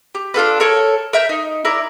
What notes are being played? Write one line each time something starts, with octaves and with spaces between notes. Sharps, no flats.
G4
D4 F4 A4 B4
A4 A#4 C#5
A#4 E5 G6
D#4
E4 A#4 D5